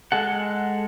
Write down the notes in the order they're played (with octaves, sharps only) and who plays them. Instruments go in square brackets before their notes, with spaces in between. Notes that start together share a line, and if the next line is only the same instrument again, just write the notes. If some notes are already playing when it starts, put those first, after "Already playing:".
[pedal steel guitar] G#3 A4 F#5